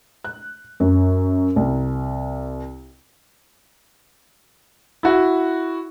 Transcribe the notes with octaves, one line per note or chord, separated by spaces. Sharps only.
F#6
F#2
C2
E4 F#4